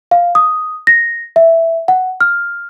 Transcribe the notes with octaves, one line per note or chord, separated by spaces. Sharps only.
F5
D#6
A#6
E5
F#5
F6